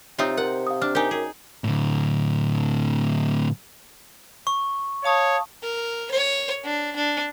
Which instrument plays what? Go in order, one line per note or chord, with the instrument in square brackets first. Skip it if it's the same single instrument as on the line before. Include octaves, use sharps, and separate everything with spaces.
[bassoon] C3 [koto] C4 D#4 F4 [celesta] C#5 E5 D#6
[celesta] A#4 C5 [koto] F#5
[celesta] F5 D#6
[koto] D4 [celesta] F6
[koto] D#4 G4 [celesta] A#4 G#5
[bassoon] F#2 [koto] G#4
[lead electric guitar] A2 D3
[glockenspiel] C#6
[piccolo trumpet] C#5 [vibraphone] F5 A5 D#6
[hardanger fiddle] A#4
C#5
D4
D4